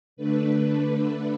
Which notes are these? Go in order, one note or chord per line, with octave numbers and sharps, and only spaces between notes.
D3 A3 D4 B4
B4